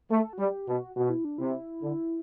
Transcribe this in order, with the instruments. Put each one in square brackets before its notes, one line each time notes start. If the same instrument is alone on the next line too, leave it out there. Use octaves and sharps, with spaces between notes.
[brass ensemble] A3 [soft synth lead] A4
[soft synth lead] F#4
[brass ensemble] G3 [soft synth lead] G4
[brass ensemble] B2 [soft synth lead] F#4
[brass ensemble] B2 [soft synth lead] F#4
[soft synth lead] E4
D4
[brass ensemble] C3 [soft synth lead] E4
[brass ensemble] D3